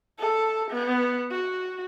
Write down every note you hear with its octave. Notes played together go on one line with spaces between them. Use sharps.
A4
B3
F#4